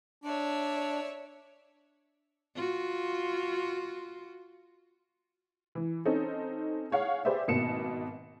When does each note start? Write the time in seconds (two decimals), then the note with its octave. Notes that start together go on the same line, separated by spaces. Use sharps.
0.24 D4 C#5 D5 E5
2.56 F4 F#4
5.75 E3
6.05 C4 C#4 D#4 A4
6.91 G#4 C#5 F5 F#5
7.25 G4 G#4 B4 C5 D5 E5
7.48 G#1 B2 A#3 C#7 E7